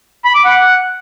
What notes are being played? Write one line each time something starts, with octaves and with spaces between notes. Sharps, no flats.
B5
D6
F#5